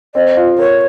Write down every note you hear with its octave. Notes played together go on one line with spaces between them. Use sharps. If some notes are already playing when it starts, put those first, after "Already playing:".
C4 D#5
F4
A#4 C#5